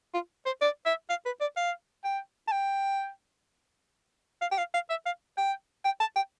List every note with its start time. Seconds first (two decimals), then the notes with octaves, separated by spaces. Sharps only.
0.14 F4
0.46 C5
0.62 D5
0.86 E5
1.10 F5
1.26 B4
1.41 D5
1.57 F5
2.05 G5
2.48 A5
2.52 G5
4.41 F5
4.51 G5
4.58 F5
4.74 F5
4.90 E5
5.06 F5
5.37 G5
5.85 G5
6.00 A5
6.16 G5